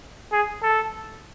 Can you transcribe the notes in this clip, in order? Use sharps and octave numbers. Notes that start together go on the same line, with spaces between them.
G#4
A4